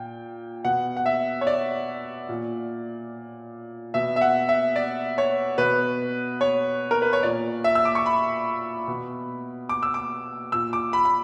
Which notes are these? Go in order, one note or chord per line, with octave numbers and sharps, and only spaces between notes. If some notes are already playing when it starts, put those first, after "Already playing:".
Already playing: A#2 G5
B2 F#5
F#5
E5
C#5
D5
A#2
B2 E5
E5
F#5
E5
D5
C#5
B2 B4
C#5
A#4
B4
C#5
A#2 D5
E5
E6
D6
C#6
B5
B2
D6
E6
D6
A#2 E6
D6
B5
B5